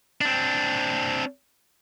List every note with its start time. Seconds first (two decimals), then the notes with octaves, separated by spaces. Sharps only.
0.21 C4 D4